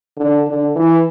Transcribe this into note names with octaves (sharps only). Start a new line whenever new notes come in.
D3
D3
E3